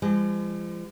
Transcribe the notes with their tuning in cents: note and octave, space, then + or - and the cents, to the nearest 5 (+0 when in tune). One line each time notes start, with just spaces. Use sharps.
F3 -40 G#3 -40